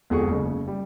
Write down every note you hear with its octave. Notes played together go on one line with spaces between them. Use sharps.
E1 F2 D3 G#4 F#5 C#6
F#1 C#3
G3